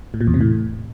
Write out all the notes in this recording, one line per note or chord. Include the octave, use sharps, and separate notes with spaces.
A2
A#2
E2
C3
A2